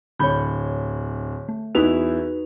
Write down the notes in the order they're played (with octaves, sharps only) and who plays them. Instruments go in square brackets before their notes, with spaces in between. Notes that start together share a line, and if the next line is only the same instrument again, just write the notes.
[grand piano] D1 B5 G6 [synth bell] D3 C#5
[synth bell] A3
[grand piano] E2 E4 F7 [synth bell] D#4 F#4 B4